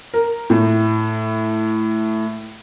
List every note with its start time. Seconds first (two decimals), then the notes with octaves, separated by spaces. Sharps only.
0.14 A#4
0.50 A2